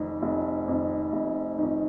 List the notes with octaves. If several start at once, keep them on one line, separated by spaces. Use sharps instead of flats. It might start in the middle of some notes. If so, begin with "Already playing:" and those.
Already playing: F1 F2 D#3
F1
F2 D#3
F1
F2 D#3